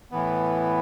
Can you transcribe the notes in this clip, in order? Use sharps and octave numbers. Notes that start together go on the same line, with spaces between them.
A2 E3 B3